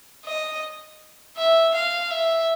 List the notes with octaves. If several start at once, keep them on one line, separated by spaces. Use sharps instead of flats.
D#5
E5
F5
E5